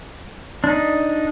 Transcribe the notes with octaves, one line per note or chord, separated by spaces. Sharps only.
D4 D#4